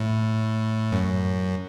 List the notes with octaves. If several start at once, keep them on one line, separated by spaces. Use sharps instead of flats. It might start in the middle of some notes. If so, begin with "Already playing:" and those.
Already playing: A2
F#2